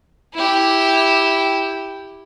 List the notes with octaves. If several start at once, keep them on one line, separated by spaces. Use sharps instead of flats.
E4 G4